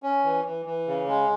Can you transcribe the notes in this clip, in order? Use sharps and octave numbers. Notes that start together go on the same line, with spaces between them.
C#4
E3
E3
E3
C#3
G#3